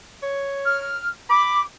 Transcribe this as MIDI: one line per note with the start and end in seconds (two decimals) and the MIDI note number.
0.23 0.99 73
0.65 1.07 89
1.29 1.59 83
1.29 1.62 86